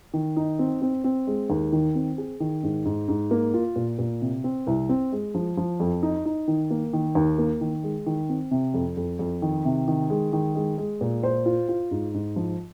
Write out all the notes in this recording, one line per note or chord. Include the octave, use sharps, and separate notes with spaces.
D#3
D#4
C4
C4
C4
G#3
D#2
D#3
C4
G#4
D#3
G#2
G#2
G#2
A#3
F4
A#2
A#2
C3
C4
C2
C4
G#3
F3
F3
F2
D#4
D#4
D#3
A#3
D#3
D#2
A#3
D#3
G#3
D#3
C4
C3
F2
F2
F2
D#3
C3
D#3
G#3
D#3
G#3
G#3
A#2
C5
F4
F4
G#2
G#2
F3